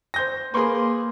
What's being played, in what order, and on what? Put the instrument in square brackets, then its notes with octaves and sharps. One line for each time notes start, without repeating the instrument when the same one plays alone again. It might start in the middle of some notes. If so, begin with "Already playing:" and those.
[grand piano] C5 G6 A#6
[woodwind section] A#3 [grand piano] G#4 A#4 B4 [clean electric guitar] C6